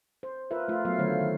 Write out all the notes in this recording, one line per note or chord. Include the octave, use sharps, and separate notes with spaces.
C5
F4 A#4 B4 E5
A3 F4
F#3 A3 B3 F5
D3 D#3 F#3 A3 C5 C#5
D#3